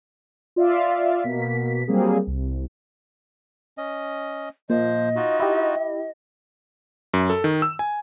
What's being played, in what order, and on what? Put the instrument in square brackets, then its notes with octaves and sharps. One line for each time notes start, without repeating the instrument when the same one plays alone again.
[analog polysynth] F4 D5 E5 F5
B2 A#3 B6
F#3 G3 A#3 C4 G#4
C2
[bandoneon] C#4 D#5
[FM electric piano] A#2 [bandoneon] F3 C5 [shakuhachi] D#5
[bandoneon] D#4 F4 F#4
[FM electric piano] E4 G4
[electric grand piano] F#2
A4
D#3
E6
G#5